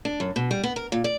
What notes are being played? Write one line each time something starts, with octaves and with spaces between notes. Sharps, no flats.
D4
F#2
B2
G3
B3
A#4
A#2
D5